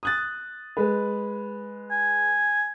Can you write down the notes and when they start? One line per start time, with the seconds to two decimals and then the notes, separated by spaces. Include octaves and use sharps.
0.03 D#6 F#6 A6
0.77 G#3 B4
1.91 G#5